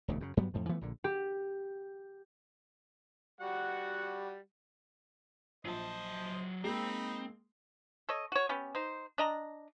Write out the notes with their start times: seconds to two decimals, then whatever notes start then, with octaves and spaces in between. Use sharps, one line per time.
0.08 E1 D2 C#3
0.21 F#2 C#3
0.37 G2 F#3 G3 B3
0.54 F2 A2 F3
0.69 E3 F3 A3 B3
0.81 A#1 A#2 D3
1.04 G4
3.41 G3 F#4 F#5
5.65 A#1 F#3 C5 D#5 A5
6.64 G#3 A#3 C4 D#4 B5
8.09 A4 C#5 D#5
8.32 F#4 C#5
8.49 B3 C#4 G4
8.75 D#4 C5
9.18 D4 D#5 A#5